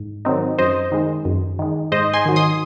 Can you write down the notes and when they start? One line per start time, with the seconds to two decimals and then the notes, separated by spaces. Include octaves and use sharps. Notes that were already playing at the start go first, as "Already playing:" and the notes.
Already playing: G#2
0.25 D#3 F#3 C4 D#4
0.59 F#2 C5 D#5
0.92 D#3 G#3
1.25 F#2
1.59 D#3 G#3
1.92 G#2 C5 D#5
2.13 G#5 C6
2.26 D#3 F#3
2.36 C6 D#6